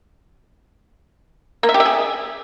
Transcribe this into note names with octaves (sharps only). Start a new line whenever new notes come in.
A#3
E5
G4
E5
G#4